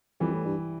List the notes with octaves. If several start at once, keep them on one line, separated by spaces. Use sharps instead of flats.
F2 E3 G3
A2
G2